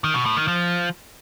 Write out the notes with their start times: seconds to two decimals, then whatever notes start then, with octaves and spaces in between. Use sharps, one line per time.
0.04 D#3
0.15 B2
0.26 A2
0.37 D#3
0.48 F3